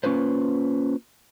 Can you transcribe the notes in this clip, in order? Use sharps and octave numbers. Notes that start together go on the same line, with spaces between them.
A#3 C#4 F4 B4 C5